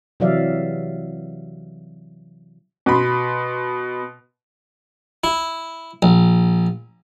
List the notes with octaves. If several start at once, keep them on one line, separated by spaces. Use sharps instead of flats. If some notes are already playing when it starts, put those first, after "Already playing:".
C3 E3 F#3 D5 E5 F5
B2 B5 C6
E4
A#1